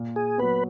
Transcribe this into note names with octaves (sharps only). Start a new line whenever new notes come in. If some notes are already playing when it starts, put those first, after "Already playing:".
Already playing: A#2
G#4
F#3 B3 B4